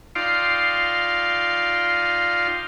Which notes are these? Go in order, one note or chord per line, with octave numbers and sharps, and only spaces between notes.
D#4 F4 D5 F5 G5 C6